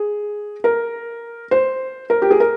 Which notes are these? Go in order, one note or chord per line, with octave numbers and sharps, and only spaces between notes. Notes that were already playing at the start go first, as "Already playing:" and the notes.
Already playing: G#4
A#4
C5
A#4
G4
G#4
A#4